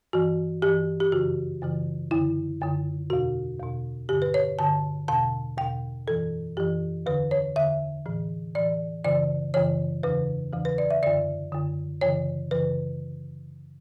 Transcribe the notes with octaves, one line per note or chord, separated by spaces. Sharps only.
G2 E3 F#4
G2 E3 G4
G4
F#2 C#3 E3 F#4
F#2 C#3 E3
F#2 D3 E4
F#2 D3
E2 B2 F#4
E2 B2
G2 D3 G4
B4
C#5
G2 D3 A5
E2 B2 A5
E2 B2 G5
F#2 E3 A4
F#2 E3 G4
E2 D3 B4
C#5
E2 D3 E5
A2 E3
A2 E3 D5
F#2 C#3 E3 D5
F#2 C#3 E3 C#5
E2 C#3 E3 B4
E2 C#3 E3
B4
D5
E5
F#2 D3 D5
F#2 D3
F#2 C#3 E3 C#5
F#2 C#3 E3 B4